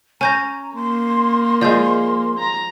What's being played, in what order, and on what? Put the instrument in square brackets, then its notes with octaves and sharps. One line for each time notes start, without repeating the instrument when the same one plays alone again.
[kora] C#4 [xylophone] G#5 G6 A#6 [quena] A#5
[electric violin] A#3 [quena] C6
[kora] F3 G#3 [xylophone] D5 G6
[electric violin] A#5